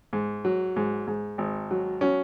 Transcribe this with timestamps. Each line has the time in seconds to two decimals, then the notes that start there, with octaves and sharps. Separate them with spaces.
0.13 G#2
0.45 F#3
0.76 G#2
1.07 G#2
1.38 G#1
1.71 F#3
2.01 F#3 C#4